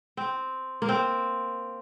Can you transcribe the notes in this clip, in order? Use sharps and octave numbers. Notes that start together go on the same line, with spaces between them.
C4
A#3
C4